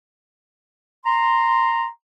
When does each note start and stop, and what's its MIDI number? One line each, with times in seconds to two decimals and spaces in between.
1.05 1.88 82
1.05 1.88 84